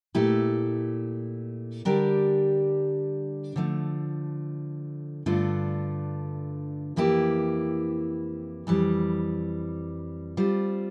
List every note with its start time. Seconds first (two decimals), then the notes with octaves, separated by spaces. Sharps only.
0.15 A#2 A3 E4 G4
1.85 D3 G3 D4 G4 A#4
3.56 D3 F3 A3
5.26 G2 D3 A3 D4 F4
6.96 F2 E3 A#3 E4 G4
8.67 F2 E3 G3
10.37 G3 C4 F4 C5